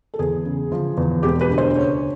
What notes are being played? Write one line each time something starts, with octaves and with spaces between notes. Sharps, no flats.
A4
E2 G#4
C#3
F3
E2
E1 G4
B4
D2
C5
C#3 C#5